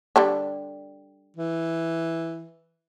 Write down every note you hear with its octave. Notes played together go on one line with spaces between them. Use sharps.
D3 G3 D4
E3